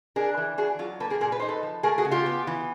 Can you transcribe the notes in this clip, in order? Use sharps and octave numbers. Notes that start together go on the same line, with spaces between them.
D4 G#4 A#4
E3
D4 F#4 G#4
F#3 F4
A#3 A4 B4
G#4 A#4
A#2 G#4 A#4
B4
D#4 C5
A4 B4
F3
A3 G#4 A#4
F#4 G#4
C#3
F4 G4
B3
E3